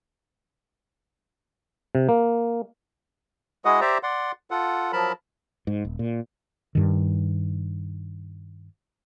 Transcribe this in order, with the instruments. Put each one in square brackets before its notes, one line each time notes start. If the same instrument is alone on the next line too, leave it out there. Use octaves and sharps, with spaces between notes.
[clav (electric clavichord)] C3
A#3
[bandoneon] G#3 E4 F#4 G#4 D#5 F#5
G4 C5 D5 E5 A#5
D5 F#5 C6
F4 A4 F#5
F3 F#3 A#4 A5 B5
[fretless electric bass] G#2
D#1
A#2
G2 D#3